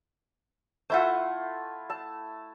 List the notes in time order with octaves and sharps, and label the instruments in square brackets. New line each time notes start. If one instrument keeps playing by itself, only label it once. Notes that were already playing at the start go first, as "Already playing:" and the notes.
[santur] A3 E4 F4 [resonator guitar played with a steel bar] C5 E5 F#5
[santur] A5 E6